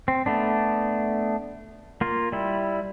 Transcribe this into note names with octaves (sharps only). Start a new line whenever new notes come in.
C4
A3 B3 D4
A#3 F4
G3 E4